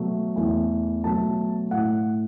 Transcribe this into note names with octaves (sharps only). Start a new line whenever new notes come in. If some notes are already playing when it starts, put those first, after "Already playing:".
Already playing: B2 F#3 A3
E2 E3 A3
B2 F#3 A3 A5
A2 A3 F#5